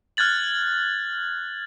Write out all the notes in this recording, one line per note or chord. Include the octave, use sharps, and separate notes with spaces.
F6 F#6 G#6 A6 F#7